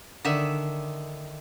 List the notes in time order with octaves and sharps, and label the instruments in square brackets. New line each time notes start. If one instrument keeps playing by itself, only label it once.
[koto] D3 D#3 E5